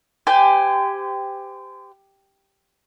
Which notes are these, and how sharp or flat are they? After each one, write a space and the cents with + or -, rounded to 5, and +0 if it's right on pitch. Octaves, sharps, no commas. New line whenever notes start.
G4 +5 C5 -35 G#5 +0